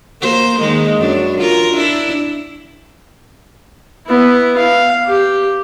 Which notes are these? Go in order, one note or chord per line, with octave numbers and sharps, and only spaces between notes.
A#3 C5
D#3 G#3 A#3
F#2 D4
F4 A#4
D4 E4
B3 E4
F5
G4